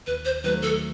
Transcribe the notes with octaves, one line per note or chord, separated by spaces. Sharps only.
D#2 B4
C5
D#3 F#3 A3 B4
A4